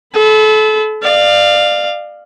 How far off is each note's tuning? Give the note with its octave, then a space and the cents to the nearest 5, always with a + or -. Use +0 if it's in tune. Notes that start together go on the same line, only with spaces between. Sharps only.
A4 -30 B5 +25
D5 +30 F5 +0